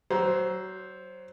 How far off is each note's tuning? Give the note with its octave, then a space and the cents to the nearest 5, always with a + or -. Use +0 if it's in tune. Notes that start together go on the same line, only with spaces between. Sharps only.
F#3 +25 C5 +0